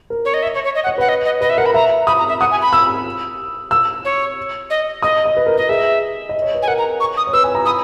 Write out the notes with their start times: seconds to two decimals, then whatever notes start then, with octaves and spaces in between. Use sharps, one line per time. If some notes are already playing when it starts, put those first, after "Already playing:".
0.10 A#4
0.25 C#5
0.34 D#5
0.43 E5
0.54 C#5
0.64 C#5
0.75 D#5
0.84 F#5
0.87 C#5
0.98 B4 F#5
1.09 D#5
1.25 D#5
1.41 B4 D#5
1.50 E5
1.58 A#4 F#5
1.66 B5
1.74 E5 A#5
2.07 B5 D#6
2.19 A#5
2.29 E5
2.40 F#5 D#6
2.51 G#5
2.62 B5
2.73 E6
3.71 E6
4.05 C#5
4.70 D#5
5.02 D#5 D#6
5.25 D#5
5.37 B4
5.46 A#4
5.57 A#4 D#5
5.69 G#4 E5
6.29 D#5
6.42 C#5
6.54 B4
6.62 G#5
6.68 A#4 F#5
6.78 A#5
7.00 C#6
7.17 D#6
7.27 C#5
7.33 B4 E6
7.44 G#5
7.55 A#5
7.66 B5 D#6